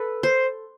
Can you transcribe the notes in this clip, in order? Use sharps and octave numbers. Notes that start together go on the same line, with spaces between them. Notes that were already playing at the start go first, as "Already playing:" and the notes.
Already playing: A4 B4
C5